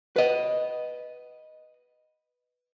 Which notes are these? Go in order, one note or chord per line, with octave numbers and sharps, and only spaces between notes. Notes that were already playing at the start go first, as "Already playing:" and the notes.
B4 D#5